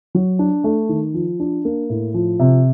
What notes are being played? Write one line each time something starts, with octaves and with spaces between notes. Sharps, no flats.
F#3
D4
A3
D#3
F3
D4
A#3
A2
F3
C3